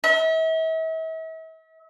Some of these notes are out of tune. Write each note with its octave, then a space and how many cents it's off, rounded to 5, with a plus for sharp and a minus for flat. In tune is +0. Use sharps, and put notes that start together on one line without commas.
E5 -40